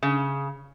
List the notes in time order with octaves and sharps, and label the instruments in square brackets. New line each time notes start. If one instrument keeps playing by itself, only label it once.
[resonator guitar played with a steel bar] C#3